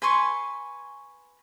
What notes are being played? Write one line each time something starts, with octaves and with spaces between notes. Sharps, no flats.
B4 G#5 C6 C#6